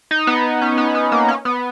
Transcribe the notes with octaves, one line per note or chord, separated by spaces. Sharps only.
D#4
B3
C#4
B3
B3
A#3
C#4
B3